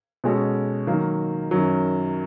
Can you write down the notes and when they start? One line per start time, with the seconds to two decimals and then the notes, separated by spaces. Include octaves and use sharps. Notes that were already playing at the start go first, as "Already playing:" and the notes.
0.24 B2 G#3 C#4 F#4 A4
0.87 D#3 F#3 A#3
1.51 F#2 D#3 F#3